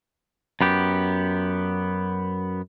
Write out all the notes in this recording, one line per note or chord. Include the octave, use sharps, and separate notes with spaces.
F#2 B3 G4